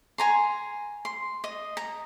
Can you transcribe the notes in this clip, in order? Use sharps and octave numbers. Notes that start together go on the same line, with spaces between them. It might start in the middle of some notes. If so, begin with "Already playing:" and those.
G#5 A#5 C6
C6
D#5
A#5